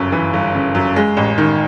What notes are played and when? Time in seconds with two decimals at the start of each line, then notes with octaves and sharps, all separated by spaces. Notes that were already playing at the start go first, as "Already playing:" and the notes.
Already playing: G1 F#2 C#3
0.12 E3
0.33 G1
0.55 C#3
0.75 F#2
0.96 G#3
1.17 A1
1.38 D#3